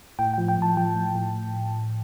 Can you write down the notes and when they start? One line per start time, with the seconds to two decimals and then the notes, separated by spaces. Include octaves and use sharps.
0.19 A2 G5
0.34 F3 G5
0.48 G5
0.57 A2 A5
0.77 F3 G5
0.96 A2
1.15 A2